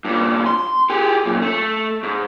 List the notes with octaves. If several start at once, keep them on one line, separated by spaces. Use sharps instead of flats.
G2 A#2
C6
G4 G#4
F#2 A#2
A3
G#2